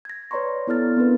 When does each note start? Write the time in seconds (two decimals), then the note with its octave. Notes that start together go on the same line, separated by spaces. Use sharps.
0.05 G#6 A#6
0.31 B4 C#5 D5 A#5 C6 C#6
0.67 B3 E4 A4 D5 F6 A6
0.97 B3 C4 D4 E4 A#4 B4